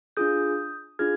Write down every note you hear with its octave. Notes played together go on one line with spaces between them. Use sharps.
D4 F4 G#4 D#6 G6
D4 F4 G#4 F6 G#6